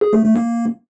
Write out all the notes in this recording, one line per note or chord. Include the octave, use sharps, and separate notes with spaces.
G#4
A3
A3
A#3